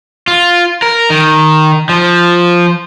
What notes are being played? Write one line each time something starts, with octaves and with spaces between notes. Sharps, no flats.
F4
A#4
D#3
F3